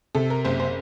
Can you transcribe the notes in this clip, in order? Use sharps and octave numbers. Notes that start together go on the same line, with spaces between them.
C3 A4
A#4
F#1 C5
C5